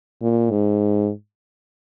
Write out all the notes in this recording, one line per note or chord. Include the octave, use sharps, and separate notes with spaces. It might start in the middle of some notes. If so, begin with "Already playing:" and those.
A#2
G#2